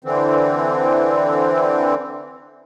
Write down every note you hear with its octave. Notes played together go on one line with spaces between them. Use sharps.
D3 E3 C4